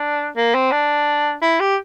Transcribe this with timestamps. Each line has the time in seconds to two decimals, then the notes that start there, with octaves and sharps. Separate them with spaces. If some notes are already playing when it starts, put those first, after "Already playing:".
Already playing: D4
0.36 A#3
0.54 C4
0.71 D4
1.42 E4
1.60 G4